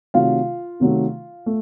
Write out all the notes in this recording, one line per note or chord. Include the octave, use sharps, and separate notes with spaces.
C3 D#3 F#3 A3 F4 F5
C3 D#3 F#3 A3
A3